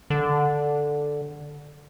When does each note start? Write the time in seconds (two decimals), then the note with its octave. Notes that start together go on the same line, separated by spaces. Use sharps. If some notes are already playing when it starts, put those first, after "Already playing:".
0.10 D3